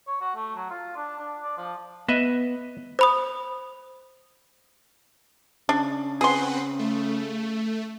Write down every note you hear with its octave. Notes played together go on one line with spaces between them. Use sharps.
C#5
F#4
A3
F#3
F4
D4
D4
D5
F3
B3 B4 D#5 E5
C5 B5 D#6
C#3 D4
C4 G#4 B4 F#5 C6
A3